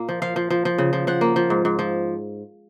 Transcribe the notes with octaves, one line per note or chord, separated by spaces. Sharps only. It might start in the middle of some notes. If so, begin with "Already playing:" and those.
Already playing: A#2 A#3
F3
F3 F5
F3
F3
F3
C#3
F3
F3 F#5
A#3
F3
G#2
G#2
F3